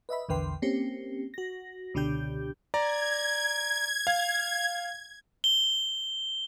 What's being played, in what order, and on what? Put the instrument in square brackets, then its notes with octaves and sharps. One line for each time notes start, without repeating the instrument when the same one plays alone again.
[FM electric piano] B4 D#5 E5 B5
A#1 E2 D3 B4 G5 C6
A#3 C4 C#4 G4
F#4 A#6
C#2 B2 D3 D4 G4 G6
[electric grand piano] D5 A#5 [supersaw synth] G#6
[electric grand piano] F5
[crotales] G7